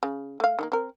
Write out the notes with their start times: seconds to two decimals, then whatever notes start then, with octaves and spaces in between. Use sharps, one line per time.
0.03 C#3
0.40 A3 F5
0.59 D#3 G#3 A#3
0.72 C4 A#4